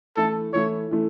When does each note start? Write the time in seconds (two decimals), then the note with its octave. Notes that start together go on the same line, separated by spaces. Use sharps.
0.16 E3 A3 E4 A4
0.53 E3 A3 E4 C#5
0.91 E3 A3